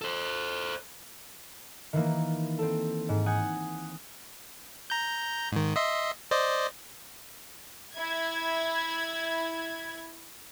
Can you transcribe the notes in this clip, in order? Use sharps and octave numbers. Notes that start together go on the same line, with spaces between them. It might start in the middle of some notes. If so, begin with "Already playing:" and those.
A4 C5
D#3 E3 A#3
C4 A4
G#2
F#5 G#5 D#6 G6
A#5 G6
G#2 D#3
D#5 E5 C6
C5 D5 D#5
E4 G#6